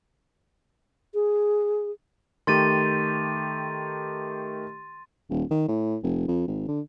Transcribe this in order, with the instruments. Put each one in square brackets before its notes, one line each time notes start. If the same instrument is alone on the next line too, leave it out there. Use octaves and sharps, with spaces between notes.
[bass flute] G#4
[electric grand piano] D#3 A3 G4 [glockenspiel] C6 A6 D#7
[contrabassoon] D#1
D#3
A2
F1
F2
G#1
D3